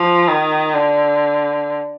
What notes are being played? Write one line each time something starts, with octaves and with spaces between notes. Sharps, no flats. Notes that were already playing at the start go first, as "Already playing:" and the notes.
Already playing: F3
D#3
D3